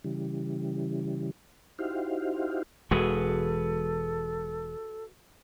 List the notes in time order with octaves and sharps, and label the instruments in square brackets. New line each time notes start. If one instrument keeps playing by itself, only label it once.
[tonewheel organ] C#3 E3 G3
D#4 E4 F#4 G4 C5 F5
[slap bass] E1 E3 G#3 [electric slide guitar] F#4 G#4 B4 [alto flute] A4